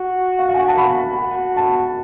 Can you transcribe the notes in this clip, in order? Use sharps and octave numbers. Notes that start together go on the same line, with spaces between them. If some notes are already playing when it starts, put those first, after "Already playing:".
Already playing: F#4
F5
F5
G#5
F#5
A5
B5
F#4
A5